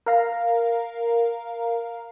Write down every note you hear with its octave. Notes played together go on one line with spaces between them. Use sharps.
A#4 F5 A#5